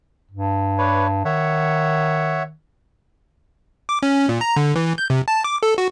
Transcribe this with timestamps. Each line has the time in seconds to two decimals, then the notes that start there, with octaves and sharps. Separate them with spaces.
0.31 G2
0.78 D4 B4 C#5
1.25 D#3 C#5 E5 F#5
3.89 D6
4.03 C#4
4.29 A#2
4.41 A#5
4.56 D3
4.76 E3
4.98 G6
5.10 C3
5.28 A5
5.44 D6
5.63 A4
5.78 F#4